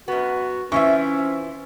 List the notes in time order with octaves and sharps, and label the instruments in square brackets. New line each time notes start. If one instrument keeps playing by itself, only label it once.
[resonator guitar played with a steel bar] F#2 B3 [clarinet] F#4
[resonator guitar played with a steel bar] E3 F3 C4 [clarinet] C#4 [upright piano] E5 C#6